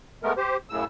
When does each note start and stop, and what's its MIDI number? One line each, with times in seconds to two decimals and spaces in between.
0.23 0.33 56
0.23 0.33 57
0.23 0.33 59
0.23 0.33 70
0.37 0.57 67
0.37 0.57 72
0.70 0.85 42
0.70 0.85 45
0.70 0.85 49
0.70 0.85 88